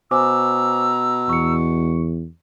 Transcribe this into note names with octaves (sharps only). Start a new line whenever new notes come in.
B2 C5 G#5 A#5 D6 E6
E2 C#6 C#7